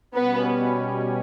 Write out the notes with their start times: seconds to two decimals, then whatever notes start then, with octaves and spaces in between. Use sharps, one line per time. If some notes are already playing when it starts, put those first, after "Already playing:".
0.16 B2 G3 B3 C#4 B4